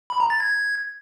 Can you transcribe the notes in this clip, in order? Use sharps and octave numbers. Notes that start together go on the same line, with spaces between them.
B5
A#5
A6
G#6